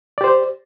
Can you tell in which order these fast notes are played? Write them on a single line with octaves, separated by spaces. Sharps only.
D5 G4 C5